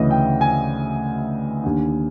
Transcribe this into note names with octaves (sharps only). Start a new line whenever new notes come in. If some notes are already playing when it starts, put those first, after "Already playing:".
Already playing: D2 C#3 E3 D#5
G5
G#5
D#2 D3